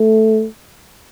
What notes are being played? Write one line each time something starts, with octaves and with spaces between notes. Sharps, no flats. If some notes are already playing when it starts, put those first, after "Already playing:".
Already playing: A3